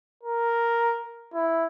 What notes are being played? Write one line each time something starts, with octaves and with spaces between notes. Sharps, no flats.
A#4
E4